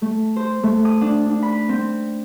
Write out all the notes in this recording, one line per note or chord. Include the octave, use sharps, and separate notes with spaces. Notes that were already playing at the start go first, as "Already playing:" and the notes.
A3
C5
A3
D#6
D4
D4
B5
C4